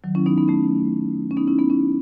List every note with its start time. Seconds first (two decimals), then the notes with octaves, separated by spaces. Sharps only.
0.04 D#3 F#3
0.15 C#4 E4
0.26 B3 D#4
0.38 B3 D#4
0.48 A3 C#4
1.31 C#4
1.37 B3 D#4
1.47 C#4 E4
1.59 B3 D#4
1.70 C#4 E4